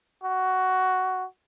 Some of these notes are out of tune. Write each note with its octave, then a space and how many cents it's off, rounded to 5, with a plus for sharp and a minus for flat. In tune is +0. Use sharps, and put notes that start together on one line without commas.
F#4 +10